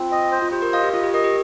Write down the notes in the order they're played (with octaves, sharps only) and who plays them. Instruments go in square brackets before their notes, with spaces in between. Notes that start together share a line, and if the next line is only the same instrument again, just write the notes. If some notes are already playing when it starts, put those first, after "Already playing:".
Already playing: [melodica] C4 [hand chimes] F4
[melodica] D#5
C5
[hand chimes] F4
[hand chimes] G4 [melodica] C5
[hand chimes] A#4
[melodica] D#5 [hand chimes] F5
[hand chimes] G4
[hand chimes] F4 [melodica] D#5
[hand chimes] G4
[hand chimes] A#4 [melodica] D#5
[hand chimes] G4